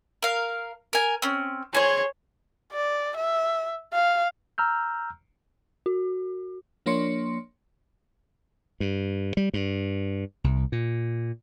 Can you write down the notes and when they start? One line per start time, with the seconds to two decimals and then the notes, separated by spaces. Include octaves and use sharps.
0.22 A#4 F5
0.93 A#4 G#5
1.22 C4 C#4
1.75 G#4 C5 C#5
2.73 D5
3.17 E5
3.93 F5
4.58 A#5 E6 F6 G6
5.86 F#4
6.86 F3 A#3 D4 C#5 C6 C#7
8.80 G2
9.37 G3
9.54 G2
10.44 C2
10.72 A#2